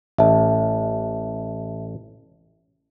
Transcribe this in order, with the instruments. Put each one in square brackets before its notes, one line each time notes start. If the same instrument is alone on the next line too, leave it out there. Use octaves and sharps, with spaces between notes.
[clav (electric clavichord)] A1 [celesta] E5 A5